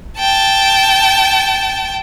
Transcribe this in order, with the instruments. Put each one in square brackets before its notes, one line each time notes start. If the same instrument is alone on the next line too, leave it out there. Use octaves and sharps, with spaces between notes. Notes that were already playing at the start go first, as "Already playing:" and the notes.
[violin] G5 A5